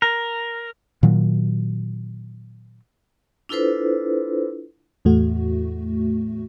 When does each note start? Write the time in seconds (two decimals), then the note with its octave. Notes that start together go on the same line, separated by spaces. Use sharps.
0.02 A#4
1.03 A#2 D#3 F#3
3.49 D4 E4 F4 A4 B4 C5
5.05 E2 A2 A3 F#4